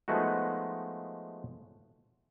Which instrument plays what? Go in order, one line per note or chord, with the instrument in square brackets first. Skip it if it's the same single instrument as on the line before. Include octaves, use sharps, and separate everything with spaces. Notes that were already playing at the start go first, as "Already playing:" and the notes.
[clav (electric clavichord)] F3 G#3 A3 B3 D#4 F#4